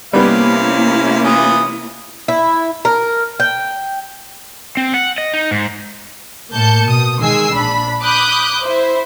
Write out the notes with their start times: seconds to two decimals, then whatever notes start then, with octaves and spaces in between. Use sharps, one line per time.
0.13 C3 G3 A#3 B3 C#4 E4 F5
1.24 E3 F4 D#6
2.28 E4
2.85 A#4
3.40 G5
4.77 C4
4.94 F#5
5.18 D#5
5.33 D#4
5.51 G#2
6.52 A2 A#3 A5 G6 C#7
6.86 B2 D#6
7.21 D#3 G#3 G#5 E6 C7
7.53 A#1 D4 B5
8.03 B5 D6 D#6 F#6 G6
8.64 E4 C5